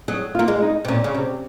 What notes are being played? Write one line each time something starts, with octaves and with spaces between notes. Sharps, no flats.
F#3 G#4
F4
A#3
G#3
D#4
C3
A#2 C#4
C#3
C3